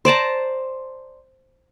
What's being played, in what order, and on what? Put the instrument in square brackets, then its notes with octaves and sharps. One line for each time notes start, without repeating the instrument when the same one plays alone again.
[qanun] C5 D5 A5 A#5